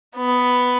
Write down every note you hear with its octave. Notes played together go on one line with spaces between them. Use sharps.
B3